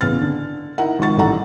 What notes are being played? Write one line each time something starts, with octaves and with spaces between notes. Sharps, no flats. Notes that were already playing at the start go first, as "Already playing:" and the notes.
A1 C#3 B3 F6 A6
D3
D#4 E4 A#4 F#5
G#1 G#2 F3 C#6 A6
A1 G#2 G3 A4 F#5 A#5